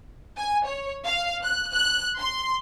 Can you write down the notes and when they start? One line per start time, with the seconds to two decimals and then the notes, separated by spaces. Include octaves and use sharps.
0.37 G#5
0.66 C#5
1.05 F5
1.43 F#6
1.71 F#6
2.18 C6